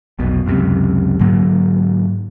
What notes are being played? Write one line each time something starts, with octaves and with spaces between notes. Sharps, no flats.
F1 B1 B2
C#2 F#2 C3
G#2 D3 F#3 A#3